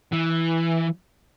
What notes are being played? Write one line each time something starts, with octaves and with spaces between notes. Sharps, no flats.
E3